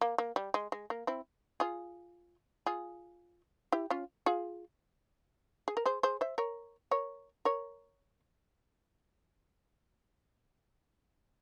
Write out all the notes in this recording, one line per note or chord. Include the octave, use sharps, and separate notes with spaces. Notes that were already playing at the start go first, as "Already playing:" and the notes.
A#3
A#3
G3
G#3
G#3
A#3
C4 E4
F4 G#4
F4 G#4
E4 G4
C#4 F4
F4 G#4
G#4
A#4
G#4 C5
G#4 C5
C5 E5
A#4 C#5
A#4 C#5
A#4 C#5